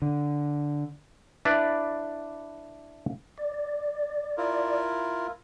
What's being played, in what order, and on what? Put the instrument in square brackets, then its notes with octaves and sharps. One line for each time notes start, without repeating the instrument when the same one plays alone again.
[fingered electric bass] D3
[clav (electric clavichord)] D4 E4 B4 D5
[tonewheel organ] D5
[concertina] E4 F4 A#4